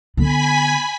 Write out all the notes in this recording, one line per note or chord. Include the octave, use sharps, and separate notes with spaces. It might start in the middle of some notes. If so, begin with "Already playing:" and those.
D3 B3 G#5 B5 B6